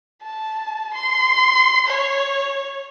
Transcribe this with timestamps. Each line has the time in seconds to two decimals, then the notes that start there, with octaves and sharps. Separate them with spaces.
0.22 A5
0.94 C6
1.87 C#5